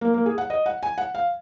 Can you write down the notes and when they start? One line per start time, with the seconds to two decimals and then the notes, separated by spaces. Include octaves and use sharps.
0.01 A#3
0.14 A#3
0.26 G#4
0.38 F#5
0.50 D#5
0.66 F#5
0.83 G#5
0.98 F#5
1.15 F5